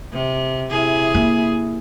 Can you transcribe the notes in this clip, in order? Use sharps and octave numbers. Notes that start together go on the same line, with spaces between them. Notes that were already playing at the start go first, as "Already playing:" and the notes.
C3
C3 E4 G#4
A#3